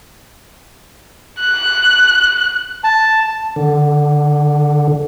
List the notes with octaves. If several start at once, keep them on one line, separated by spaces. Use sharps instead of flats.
F#6
A5
D3